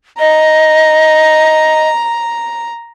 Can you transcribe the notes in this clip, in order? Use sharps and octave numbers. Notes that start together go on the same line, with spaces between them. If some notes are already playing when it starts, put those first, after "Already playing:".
D#5 A#5